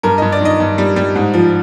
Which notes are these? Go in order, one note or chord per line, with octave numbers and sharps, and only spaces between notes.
G2 A#4
G2 D#5
D5
D#3 D#5
G2
G3
G3
G#2
F3